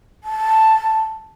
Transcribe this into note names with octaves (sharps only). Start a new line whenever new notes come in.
A5